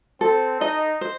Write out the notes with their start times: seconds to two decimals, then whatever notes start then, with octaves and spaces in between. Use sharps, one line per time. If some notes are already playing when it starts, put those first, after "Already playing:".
0.21 C4 A4
0.61 D#4 D#5
1.01 C5